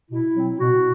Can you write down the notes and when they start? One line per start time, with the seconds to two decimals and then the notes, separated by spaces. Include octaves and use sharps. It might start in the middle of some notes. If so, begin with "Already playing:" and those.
0.10 B2 E4
0.35 F#3 C4
0.59 B2 F#4